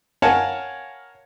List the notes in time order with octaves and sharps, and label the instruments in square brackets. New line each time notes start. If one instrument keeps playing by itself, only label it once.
[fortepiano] A#4 C#5 F5 F#5 G#5 A5